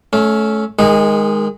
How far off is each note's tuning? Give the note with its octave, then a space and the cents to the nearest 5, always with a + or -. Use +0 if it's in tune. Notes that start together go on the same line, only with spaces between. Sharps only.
A3 -20 C#4 +10
D#3 +5 G#3 +0 G#4 -35